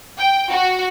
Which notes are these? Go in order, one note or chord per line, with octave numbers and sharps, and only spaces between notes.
G5
F#4